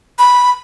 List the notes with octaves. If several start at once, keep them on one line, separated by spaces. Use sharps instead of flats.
B5